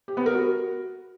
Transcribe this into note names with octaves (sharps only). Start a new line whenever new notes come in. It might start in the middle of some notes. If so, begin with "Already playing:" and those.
G4
B3
A#4
F#4